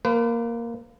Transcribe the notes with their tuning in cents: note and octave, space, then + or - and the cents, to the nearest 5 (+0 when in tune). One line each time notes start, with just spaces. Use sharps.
A#3 +0 B4 +40